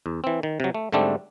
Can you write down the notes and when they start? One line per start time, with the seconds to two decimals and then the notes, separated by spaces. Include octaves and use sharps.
0.06 E2
0.24 E3 C4
0.43 D#3
0.60 C3 F#3
0.75 A3
0.92 G#2 D3 G3 A3 C4 D4